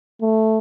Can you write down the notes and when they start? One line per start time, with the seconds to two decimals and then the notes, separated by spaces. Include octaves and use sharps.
0.21 A3